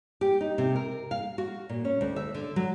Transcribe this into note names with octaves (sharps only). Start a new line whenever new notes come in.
G4
D#4
C3
A#4
F5
F#4
A#2
C#4
D2
E5
D3
F#3